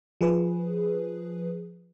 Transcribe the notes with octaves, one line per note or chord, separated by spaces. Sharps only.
F3 G#4 B4